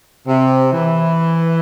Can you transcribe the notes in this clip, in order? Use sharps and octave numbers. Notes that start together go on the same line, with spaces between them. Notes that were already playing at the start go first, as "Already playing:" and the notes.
C3
E3